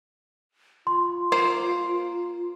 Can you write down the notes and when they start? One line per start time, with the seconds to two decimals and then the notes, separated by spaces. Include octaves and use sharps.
0.87 F4 C6
1.32 A#3 C5